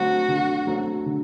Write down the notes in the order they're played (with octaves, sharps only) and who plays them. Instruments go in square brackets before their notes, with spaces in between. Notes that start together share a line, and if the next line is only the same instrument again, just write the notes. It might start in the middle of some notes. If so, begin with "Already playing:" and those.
Already playing: [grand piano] D3 F#3 A3 C4 [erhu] F#4
[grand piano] D3
F#3 A3 C4
D3